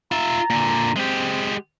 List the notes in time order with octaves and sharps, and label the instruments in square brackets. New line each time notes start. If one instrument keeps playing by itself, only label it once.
[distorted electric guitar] F4 E5 [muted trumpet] A#5
[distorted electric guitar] A#2 D3
[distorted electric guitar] G#3 G4 [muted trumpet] C4